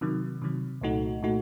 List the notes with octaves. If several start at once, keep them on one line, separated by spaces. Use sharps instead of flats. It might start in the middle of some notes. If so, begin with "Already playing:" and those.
C3 D#3 F#3
C3 D#3 F#3
C2 A#2 A3 D#4 F#4
A#2 A3 D#4 F#4